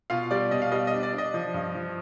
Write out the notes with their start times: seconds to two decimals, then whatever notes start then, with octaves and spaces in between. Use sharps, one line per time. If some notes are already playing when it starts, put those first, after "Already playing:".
0.10 B2 F4 F5
0.31 G3 D5
0.51 B2 D#5
0.62 F5
0.72 G3 D#5
0.87 D#5
0.93 D4
1.03 D5
1.12 D4
1.18 D#5
1.34 F3
1.54 G2
1.75 F3